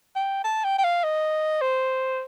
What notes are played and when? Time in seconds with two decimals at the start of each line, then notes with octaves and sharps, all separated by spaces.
0.16 G5
0.44 A5
0.64 G5
0.78 G5
0.84 F5
1.04 D#5
1.62 C5